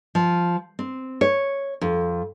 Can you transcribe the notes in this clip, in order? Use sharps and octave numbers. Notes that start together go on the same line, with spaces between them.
F3
C4
C#5
F2